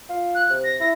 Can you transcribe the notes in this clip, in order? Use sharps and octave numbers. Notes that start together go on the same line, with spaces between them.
F4
F#6
C3
A#6
E4 A#6